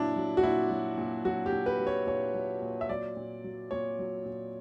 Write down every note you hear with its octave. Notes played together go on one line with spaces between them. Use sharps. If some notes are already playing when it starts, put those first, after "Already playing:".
Already playing: A#2 F#3 D4 E4
F#3
F#4
A#2 E4
F#3
A#2
F#3 F#4
G4
A#2
B4
F#3
C#5
A#2 C#5
F#3
A#2
E5
F#3 D5
A#2
F#3
A#2 C#5
F#3
A#2